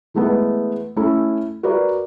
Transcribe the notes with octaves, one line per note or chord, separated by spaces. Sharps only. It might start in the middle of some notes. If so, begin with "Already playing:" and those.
E3 G#3 A3 B3
A3 C#4 E4 A4
F#4 A#4 B4 D5